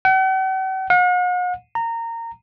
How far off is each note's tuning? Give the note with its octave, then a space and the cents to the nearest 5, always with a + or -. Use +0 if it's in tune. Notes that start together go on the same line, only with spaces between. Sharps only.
F#5 +45
F#5 -45
A#5 -20